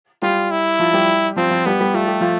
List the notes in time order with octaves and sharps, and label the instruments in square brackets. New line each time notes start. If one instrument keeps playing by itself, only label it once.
[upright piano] G3 G4 [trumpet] F4
[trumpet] E4
[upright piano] F3 F4
G3 G4
[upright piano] F3 F4 [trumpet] C4
[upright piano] F3 F4
[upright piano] G3 G4 [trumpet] B3
[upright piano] G3 G4
[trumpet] A3 [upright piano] F4
[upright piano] G4
F3 F4